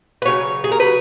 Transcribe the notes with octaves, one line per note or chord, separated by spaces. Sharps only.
B4
C#3 F#3 C#5
G#4
A#4
C#3 F#3 B4